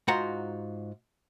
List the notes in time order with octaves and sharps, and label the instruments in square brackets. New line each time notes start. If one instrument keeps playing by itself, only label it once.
[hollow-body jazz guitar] G#2 F4 F#4 F#5 A#5